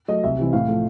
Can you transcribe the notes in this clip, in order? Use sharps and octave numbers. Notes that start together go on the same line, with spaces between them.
F#3 A3 D#5
C2 E5
C3 E3
A2 F5
F3 A3